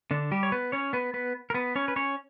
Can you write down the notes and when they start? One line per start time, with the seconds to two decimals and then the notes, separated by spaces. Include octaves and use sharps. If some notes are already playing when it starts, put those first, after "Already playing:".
0.11 D3 D4
0.31 G3 G4
0.43 C#5
0.52 B3 B4
0.72 C#4 C#5
0.93 B3 B4
1.14 B3 B4
1.50 A#4
1.54 B3 B4
1.75 C#4 C#5
1.88 B4
1.96 C#4 C#5